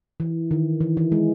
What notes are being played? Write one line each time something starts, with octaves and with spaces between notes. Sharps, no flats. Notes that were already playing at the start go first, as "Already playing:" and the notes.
E3
D#3
E3
E3
G#3